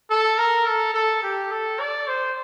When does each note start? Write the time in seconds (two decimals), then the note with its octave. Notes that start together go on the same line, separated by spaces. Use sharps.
0.10 A4
0.38 A#4
0.66 A4
0.94 A4
1.23 G4
1.51 A4
1.79 D5
2.07 C5